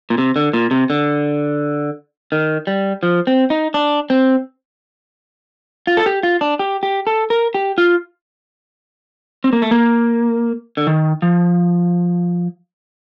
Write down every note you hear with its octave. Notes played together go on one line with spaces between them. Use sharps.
A#2
C3
D3
A#2
C3
D3
D#3
G3
F3
C4
D#4
D4
C4
F4
A4
G4
F4
D4
G4
G4
A4
A#4
G4
F4
C4
A#3
A3
A#3
D3
D#3
F3